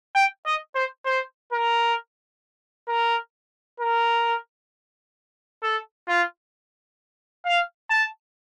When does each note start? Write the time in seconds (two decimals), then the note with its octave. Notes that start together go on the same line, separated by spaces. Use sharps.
0.15 G5
0.46 D#5
0.75 C5
1.06 C5
1.52 A#4
2.88 A#4
3.80 A#4
5.63 A4
6.08 F4
7.46 F5
7.90 A5